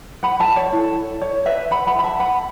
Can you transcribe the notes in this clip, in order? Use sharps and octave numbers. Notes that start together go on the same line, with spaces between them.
F#5 B5
E5 A5
C#5
E4 A4
C#5
B4 E5
F#5 B5
F#5 B5
B5
E5 A5
F#5 B5